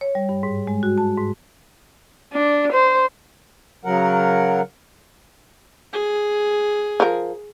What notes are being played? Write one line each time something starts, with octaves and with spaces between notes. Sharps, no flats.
C#5
G3
G2
G#2
G#3
F#4
A5
G#2
D4
C5
C#3 F#3 A#4 F#5
G#4
F3 A#4